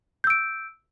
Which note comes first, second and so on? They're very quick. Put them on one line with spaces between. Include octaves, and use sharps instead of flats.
G6 E6 D7